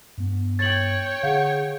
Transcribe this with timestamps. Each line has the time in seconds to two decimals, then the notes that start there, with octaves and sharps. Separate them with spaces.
0.18 G2 B3
0.59 C#5 G5 A6 F#7
1.23 D3 G#4 F5 F#5